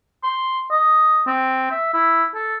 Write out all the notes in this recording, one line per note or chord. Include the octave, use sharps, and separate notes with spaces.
C6
D#5
C4
E5
E4
A4